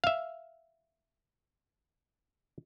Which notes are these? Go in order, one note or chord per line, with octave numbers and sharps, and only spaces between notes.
E5 F5